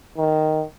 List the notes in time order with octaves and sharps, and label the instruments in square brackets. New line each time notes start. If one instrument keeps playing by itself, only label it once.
[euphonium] D#3